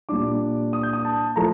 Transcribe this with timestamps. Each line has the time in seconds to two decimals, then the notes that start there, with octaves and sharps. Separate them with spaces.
0.09 A#2 G3 D4 D6
0.73 D#6
0.83 G6
0.93 D#6
1.05 A5
1.36 F3 A3 A#5